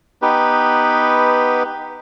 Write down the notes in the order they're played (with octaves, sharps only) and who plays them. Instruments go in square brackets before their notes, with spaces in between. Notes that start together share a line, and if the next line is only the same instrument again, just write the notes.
[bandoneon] B3 D#4 G4 B4